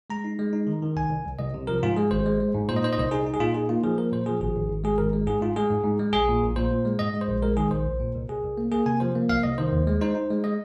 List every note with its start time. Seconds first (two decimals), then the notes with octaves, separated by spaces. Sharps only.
0.10 G#3 A#5
0.24 D#4
0.39 G#3
0.53 D#4
0.67 D#3
0.82 D#3
0.96 C2 G#5
1.11 C2
1.25 C2
1.39 C2 D#5
1.54 C3
1.67 F3 A#4
1.83 G#2 F4
1.96 G#3 G#4
2.11 G#1 C5
2.26 G#3
2.40 G#3
2.54 G#2
2.69 A#2 C5
2.76 D#5
2.83 D#4 C5
2.93 D#5
2.98 C2 C5
3.11 D#4 G#4
3.27 D#4
3.34 G#4
3.40 A#2 F4
3.54 D#4 G#4
3.69 A#3 F4
3.84 F3 G#4
3.98 A#3 A#4
4.12 A#2 C5
4.26 F3 G#4
4.41 G#1 G#4
4.55 G#1
4.70 G#1
4.84 G#3 G#4
4.98 G#1 A#4
5.13 G#3
5.27 G#2 G#4
5.41 G#2 F4
5.56 G#3 G#4
5.70 G#2
5.84 G#2
5.99 G#3
6.13 A#1 G#4
6.28 A#2
6.42 A#1
6.56 A#2 C5
6.71 A#2
6.85 G#3
6.99 G#2 D#5
7.14 G#3
7.21 C5
7.28 A#1
7.42 G#3 A#4
7.57 D#3 G#4
7.71 A#1 C5
7.86 C2
8.00 A#2
8.15 C2
8.28 C2 G#4
8.43 C2
8.58 A#3
8.71 A#3 G#4
8.86 C3 G#5
9.00 F3 C5
9.15 A#3
9.29 C2 F5
9.43 C2 D#5
9.58 D#3 C5
9.72 D#2
9.87 G#3
10.01 D#4 C5
10.15 D#4
10.30 G#3
10.44 G#3 D#5